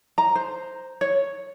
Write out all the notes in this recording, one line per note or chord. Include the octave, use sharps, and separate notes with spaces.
A#5
C5
C#5